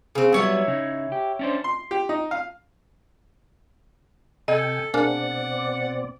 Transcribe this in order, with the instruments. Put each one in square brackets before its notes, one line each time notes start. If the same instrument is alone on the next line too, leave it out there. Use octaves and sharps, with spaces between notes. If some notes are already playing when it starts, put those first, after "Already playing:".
[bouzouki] C#3 C4
[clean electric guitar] F#3 G3 B3 [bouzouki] E4 C#5 E5
[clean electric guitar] C#3 D#4
G4
C#4 D4 C5
[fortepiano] C6
G4
D#4
F5
[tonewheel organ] C3 G5 G#5 [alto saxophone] A4 [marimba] D#5
[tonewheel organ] B2 C4 D5 [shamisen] A#3 D4 G#4 [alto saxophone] F#5